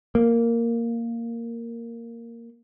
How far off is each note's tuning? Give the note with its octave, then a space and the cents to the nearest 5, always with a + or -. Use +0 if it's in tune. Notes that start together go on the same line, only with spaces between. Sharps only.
A#3 -5